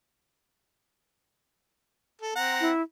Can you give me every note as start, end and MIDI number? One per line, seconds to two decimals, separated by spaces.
2.22 2.34 69
2.36 2.71 60
2.36 2.71 78
2.36 2.71 82
2.61 2.82 64